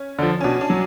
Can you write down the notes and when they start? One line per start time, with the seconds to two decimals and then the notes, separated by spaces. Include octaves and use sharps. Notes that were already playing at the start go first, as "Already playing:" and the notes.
Already playing: C#4
0.19 D3 F3
0.40 C#4
0.44 B2 D4
0.61 D4
0.70 F#3